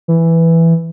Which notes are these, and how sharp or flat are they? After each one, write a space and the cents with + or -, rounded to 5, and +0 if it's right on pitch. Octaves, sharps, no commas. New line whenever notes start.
E3 +5